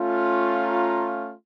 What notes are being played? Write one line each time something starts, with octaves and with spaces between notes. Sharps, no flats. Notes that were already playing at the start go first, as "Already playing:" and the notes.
Already playing: A3 C#4 F4
A#5